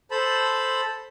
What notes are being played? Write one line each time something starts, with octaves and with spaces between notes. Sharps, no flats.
A4 C5 A5 B5